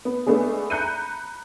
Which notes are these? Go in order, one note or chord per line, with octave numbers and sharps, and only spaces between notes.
B3
G#3 A3 B3 D4 G#4
A#5 B5 F#6 G6 C#7 D#7